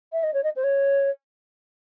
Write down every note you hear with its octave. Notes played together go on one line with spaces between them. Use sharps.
E5
D#5
C#5
D#5
C5
C#5